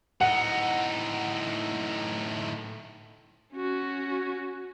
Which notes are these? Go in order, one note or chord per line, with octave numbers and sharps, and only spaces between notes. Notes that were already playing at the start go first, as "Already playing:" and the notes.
A2 D#4 F#5
C#4 F#4